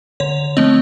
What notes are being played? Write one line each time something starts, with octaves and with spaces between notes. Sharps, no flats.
D3 C#5
F3 A3 C4 D#5